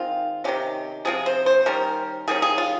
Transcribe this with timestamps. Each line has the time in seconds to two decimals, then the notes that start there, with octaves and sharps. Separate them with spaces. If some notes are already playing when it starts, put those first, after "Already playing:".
Already playing: D#3 G#3 C4 F4
0.44 C3 D#3 G#3 C#4 G4
1.05 C3 F3 C4 G#4
1.26 C5
1.46 C5
1.66 D#3 G3 C#4 A#4
2.28 D#3 G3 A#3 C#4 G#4
2.42 G#4
2.58 F4